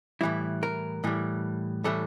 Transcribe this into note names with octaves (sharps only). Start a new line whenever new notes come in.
A2 E3 G3 E4
A#4
A2 E3 G3
A2 E3 G3 A4